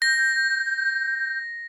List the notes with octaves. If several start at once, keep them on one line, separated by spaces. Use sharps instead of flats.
G6 A#6